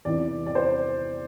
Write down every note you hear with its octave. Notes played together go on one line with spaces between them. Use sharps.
E2 C3 E3 D5
D5
C5